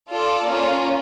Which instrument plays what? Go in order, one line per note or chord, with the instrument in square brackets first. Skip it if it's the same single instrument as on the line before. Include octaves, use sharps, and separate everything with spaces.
[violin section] F4 A4 D5
A#3 C#4 F4